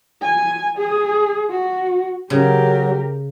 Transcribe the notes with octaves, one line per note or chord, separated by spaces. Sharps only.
G#5
G#4
F#4
C#3 F#3 G4 A#4